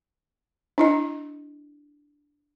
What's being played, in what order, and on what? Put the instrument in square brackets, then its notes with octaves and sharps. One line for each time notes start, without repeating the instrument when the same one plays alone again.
[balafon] D4 E4 D#5